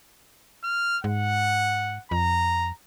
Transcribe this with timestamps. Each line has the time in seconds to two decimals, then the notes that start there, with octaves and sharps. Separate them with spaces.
0.64 F6
1.04 G#2 F#5
2.11 F2 A#5